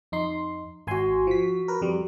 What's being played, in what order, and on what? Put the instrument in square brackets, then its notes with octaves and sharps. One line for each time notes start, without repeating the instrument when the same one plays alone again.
[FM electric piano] F2 D#4 C6
[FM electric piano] G#1 G#5 C6 [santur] F#4 E6
[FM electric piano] F3 B6
A#4 B4
F2 G3